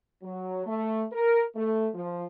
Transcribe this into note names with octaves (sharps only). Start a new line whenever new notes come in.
F#3
A3
A#4
A3
F3